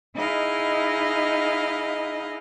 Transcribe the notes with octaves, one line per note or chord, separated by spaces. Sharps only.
D#4 E4 G#4 D#5 F5